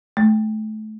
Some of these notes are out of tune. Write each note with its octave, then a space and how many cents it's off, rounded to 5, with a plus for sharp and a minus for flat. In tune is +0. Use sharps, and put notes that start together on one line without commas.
A3 -30